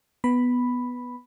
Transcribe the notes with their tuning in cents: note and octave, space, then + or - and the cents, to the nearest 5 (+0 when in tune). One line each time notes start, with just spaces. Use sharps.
B3 +0 B5 +0